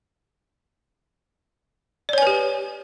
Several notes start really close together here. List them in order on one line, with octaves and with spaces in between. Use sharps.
D5 C#5 G#5 B4 G4